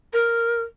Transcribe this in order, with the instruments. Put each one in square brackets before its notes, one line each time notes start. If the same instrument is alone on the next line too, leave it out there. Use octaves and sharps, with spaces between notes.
[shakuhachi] A#4